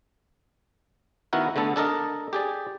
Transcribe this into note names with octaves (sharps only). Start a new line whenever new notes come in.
D#3 B3 E4 F#4 A#4
D3 A3 B3 A4
D4 A4 A#4 D#5
G4 G#4 D5